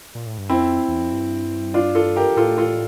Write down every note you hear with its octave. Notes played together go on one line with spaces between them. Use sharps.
A#2
A2
G2
F2 C4 E4
E2
F2
G2
D4 F4
F4 A4
G4 A#4
A2 F4 A4
F4 A4